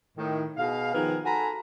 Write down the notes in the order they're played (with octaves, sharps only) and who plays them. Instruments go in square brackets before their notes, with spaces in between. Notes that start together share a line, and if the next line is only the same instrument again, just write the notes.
[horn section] A2 D#3
B2 G#4 F5
D#3 F3 B3 G#4 A#4
F#4 A4 G#5 A#5 B5